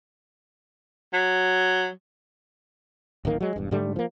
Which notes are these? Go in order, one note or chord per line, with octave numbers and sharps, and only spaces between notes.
F#3
D1 A1 D#3 A#3
F#3 G#3
E1 G2
G#2 D3 G3 A3
F3 A#3